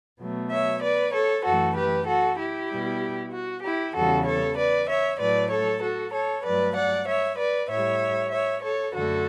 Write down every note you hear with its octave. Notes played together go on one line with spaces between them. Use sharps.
B2 F#3 A3
C#5 E5
B4 D5
A4 C#5
F#2 E3 A3 F#4 A4
G4 B4
F#4 A4
E4 G4
B2 G3
F#4
E4 G4
E2 C#3 E3 G3 F#4 A4
A4 C#5
B4 D5
C#5 E5
A2 F#3 A3 B4 D5
A4 C#5
F#4 A4
A4 C#5
G2 F#3 A3 B4 D5
D5 F#5
C#5 E5
B4 D5
A2 G3 C#5 E5
C#5 E5
A4 C#5
F#2 D3 A3 F#4 A4